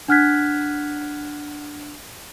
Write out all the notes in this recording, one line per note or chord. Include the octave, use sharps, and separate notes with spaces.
D4 F#5 F6 F#6 G#6 B6